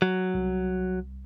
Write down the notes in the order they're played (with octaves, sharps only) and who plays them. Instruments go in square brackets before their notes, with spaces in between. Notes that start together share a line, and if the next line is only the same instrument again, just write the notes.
[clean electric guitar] F#3
[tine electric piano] C2